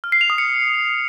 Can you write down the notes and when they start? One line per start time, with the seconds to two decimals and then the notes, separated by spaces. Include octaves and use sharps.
0.04 F6
0.12 C7
0.21 F7
0.30 D#6
0.38 C#7